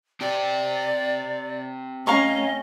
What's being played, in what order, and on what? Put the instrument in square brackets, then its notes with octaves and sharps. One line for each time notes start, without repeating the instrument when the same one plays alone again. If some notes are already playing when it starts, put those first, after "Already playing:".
[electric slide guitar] C4 G4 G5 [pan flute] D5
[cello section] A3 C#4 [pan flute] D#5 [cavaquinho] F5 A#5 C#6